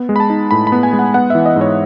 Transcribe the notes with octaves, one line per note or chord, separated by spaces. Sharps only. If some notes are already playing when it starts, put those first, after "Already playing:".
Already playing: B3
G#3
B5
A5
D#4
A2 B5
B5
B3
G#5
G#3
F#5
B3 F#5
E3 E5
D#5
G#2 C#5